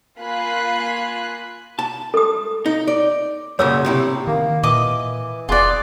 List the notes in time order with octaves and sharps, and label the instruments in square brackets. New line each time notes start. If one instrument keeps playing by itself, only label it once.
[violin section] A#3 F4 G#5 B5 F#6 C7
[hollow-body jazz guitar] A5
[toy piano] A4 D#6
[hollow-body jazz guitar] D#4
D5
[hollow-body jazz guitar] F#2 A#2 C#3 [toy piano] C#5 E6
[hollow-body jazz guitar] A2 C3 E4
[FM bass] D#3 [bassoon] A#3
[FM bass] A#2 [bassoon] E3 [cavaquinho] D#5 D6
[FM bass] F1 [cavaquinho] F4 D5 [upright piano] G#4 C6 F#6